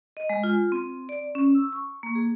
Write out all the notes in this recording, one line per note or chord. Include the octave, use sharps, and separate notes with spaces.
D#5
G#3
F4
C4
D5
C#4
E6
C#6
A#3
G#4